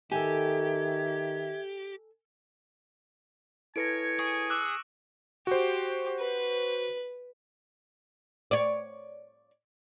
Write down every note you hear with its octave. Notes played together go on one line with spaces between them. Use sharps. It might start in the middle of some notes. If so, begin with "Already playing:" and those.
D#3 G4 A4 E5 G#5 G#6
E4 A4 B4 C#5 G#5 A#6 C#7 D7
G#4 C#6
D6 E6 F#6
F#4 G4 C5
B4
C#5 D5